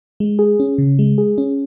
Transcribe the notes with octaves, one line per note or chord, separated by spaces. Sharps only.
G#3
G#4
C#4
C#3
G#3
G#4
C#4